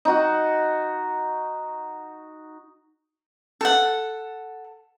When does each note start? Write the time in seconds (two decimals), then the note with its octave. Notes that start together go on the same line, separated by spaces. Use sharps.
0.05 D#4 F#4
3.61 A4 F#5